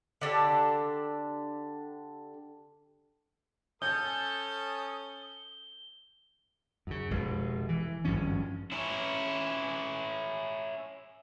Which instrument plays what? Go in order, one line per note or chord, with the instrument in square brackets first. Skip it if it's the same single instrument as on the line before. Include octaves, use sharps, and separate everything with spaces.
[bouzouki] D3 D4 G4 A4
[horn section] C#4 A4 [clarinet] D#6 [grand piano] G6 [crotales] G7
[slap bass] F#2 C#3
F1 B2 G#3
E3
G#1 G2 F3 C#4
[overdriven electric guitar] C#4 E4